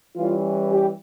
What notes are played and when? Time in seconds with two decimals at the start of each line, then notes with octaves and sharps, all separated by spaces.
0.16 E3 G3 C#4 F4
0.71 G4